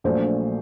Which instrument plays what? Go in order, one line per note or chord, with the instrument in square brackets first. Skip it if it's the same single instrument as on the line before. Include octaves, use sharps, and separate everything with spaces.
[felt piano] A#1 A#2 F#3 A3 D4 C5